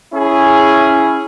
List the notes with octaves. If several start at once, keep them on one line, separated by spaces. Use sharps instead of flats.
C#4 E4 G#4